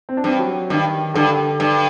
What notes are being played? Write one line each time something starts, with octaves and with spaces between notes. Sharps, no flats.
C4
D4
G2 C4
F#3
G2 D#3
G2 D3
G2